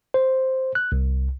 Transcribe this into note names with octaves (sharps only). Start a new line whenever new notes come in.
C5
F#6
C2